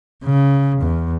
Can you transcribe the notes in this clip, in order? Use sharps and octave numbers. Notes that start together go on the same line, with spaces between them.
C#3
E2